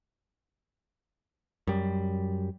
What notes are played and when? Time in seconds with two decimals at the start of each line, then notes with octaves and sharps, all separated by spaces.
1.67 F#2 G3